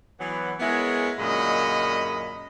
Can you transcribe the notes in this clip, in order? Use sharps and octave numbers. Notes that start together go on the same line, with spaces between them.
E3 F#3 B3
G#3 B3 E4 G#4 A#4 C#5
F#2 A#2 D3 G#3 D#5 B5